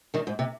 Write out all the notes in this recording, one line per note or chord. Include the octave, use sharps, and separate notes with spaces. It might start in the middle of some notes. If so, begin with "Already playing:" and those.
D#3 G3
G#2
C3